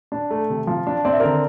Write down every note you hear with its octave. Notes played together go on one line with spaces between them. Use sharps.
D4
A3
C3
F3
D4
C4 D5
E5
D3 A#4 D5